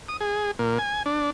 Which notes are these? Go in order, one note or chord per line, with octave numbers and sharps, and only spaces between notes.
D#6
G#4
A#2
G#5
D4